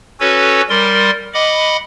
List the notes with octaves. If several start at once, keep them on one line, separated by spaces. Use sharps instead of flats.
C#4 F#4 A4 B4 C#5
G3 A#4 D5 C6
D#5 F#5 B5 D6